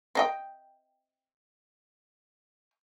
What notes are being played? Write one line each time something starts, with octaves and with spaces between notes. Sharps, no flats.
C4 D#5 G5